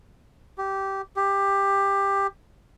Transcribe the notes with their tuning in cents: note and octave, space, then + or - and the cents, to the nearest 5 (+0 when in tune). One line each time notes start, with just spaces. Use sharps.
G4 -15
G4 +15